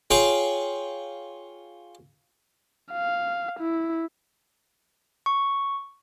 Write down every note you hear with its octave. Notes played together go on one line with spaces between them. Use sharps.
F4 G#4 C#5 F5 G5 C#6
F5
E4
C#6